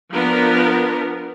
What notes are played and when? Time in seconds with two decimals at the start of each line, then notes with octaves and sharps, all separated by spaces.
0.12 F3 B3 D4 A#4